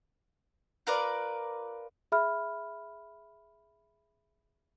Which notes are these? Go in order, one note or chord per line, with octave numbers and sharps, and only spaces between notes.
F4 A#4 B4 D5
G#4 E5 B5 F6